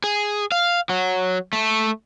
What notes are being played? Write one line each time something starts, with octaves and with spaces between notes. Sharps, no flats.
G#4
F5
F#3
A3